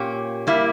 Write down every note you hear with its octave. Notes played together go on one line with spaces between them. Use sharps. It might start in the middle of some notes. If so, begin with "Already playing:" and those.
Already playing: A#2 A#3 C#4 G4
G3 A#3 E4